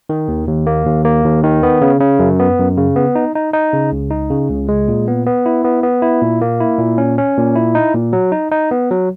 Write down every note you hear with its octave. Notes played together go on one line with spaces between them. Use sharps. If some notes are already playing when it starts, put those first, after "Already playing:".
D#3
D#2
D#2
A#3
D#2
A#3
D#2
D#3
B3
C#3
C#3
F#2
B3
F#2
C#3
B3
D#4
D#4
D#4
C#3
C#2
D#4
C#3
C#2
G#3
A#2
B3
B3
E4
B3
B3
E4
A#2
A#3
E4
A#2
C#4
C#4
A#2
E4
D#4
A#2
F#3
D#4
D#4
B3
F#3